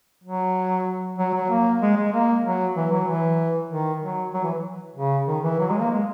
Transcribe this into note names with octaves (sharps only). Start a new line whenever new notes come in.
F#3
F#3
F#3
A#3
G#3
G#3
A#3
F#3
E3
F#3
E3
D#3
F#3
F#3
E3
C#3
D#3
E3
F#3
G#3
A#3
G#3